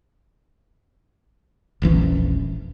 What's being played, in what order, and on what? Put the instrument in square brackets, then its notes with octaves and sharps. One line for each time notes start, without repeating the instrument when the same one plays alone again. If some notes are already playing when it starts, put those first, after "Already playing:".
[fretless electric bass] E1 A#1 E3 C#4